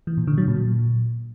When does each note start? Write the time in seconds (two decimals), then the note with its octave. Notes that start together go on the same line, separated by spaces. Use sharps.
0.07 E3
0.17 A#2
0.27 D3
0.38 F#3
0.48 A#2